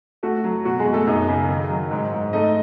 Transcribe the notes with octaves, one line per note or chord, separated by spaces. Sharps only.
A3 F#4
F#3
B2 F#4
G#3 G#4
B2
A3 A4
F#2 D#4 D#5
C#3
D#3
F#3
G#2
G#2
A3 D#4 D#5